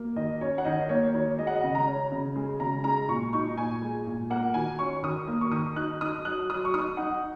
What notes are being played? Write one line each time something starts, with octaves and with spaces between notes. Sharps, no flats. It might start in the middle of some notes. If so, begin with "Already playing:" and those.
Already playing: A#3
D#3 D#5
C#4 C#5
F#5
D#3 D#5
A#3 C#5
D#3 C#5
G#3 D#5
F#5
D#5
C#3
A#5
C#4
C#3
G#3
C#3 A#5
G#3 A#5
A#2 C#6
D#4 C#6
A#2 G#5
G#3
A#2
A#3 F#5
D#3 G#5
C#4 C#6
D#3 D#6
A#3
C#6
D#3 D#6
D#4 F#6
D#4 D#6
F#3 F#6
F#3 D#6
C#6
D#4 D#6
D#4 F#5